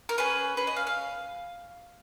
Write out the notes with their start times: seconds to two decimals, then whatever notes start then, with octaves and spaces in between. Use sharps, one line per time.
0.09 A#4
0.18 C#4 G#4 B4
0.57 C#4 G#4 B4
0.67 D#5
0.76 F5
0.87 F5